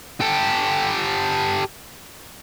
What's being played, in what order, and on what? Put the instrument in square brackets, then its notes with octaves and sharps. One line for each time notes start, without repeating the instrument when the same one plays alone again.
[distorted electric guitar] G4 A4